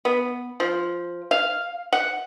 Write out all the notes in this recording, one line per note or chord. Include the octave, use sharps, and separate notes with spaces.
B3
F3
F5
F#5